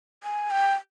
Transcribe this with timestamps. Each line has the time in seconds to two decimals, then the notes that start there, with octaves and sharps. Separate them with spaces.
0.24 G#5
0.51 G5